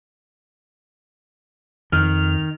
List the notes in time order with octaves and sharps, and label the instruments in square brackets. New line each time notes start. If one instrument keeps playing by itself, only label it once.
[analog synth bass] F2 [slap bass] D#3 [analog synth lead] F6